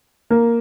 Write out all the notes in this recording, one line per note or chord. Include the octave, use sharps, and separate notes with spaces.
A#3